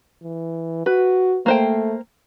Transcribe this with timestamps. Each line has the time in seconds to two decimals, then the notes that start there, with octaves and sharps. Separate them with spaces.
0.23 E3
0.86 F#4 B4
1.46 A3 A#3 C5 G5